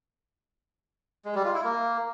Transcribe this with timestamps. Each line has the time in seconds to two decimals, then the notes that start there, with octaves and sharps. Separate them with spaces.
1.25 G#3
1.35 G3
1.45 F4
1.54 E4
1.64 A#3